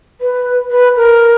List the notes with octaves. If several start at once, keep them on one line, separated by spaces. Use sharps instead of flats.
B4
B4
A#4